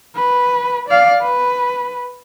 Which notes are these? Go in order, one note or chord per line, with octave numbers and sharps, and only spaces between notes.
B4
D5 F5
B4